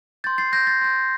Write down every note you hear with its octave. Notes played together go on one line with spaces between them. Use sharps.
C6 G6 A6
A6 C7
G6 A#6
A6
C6 G6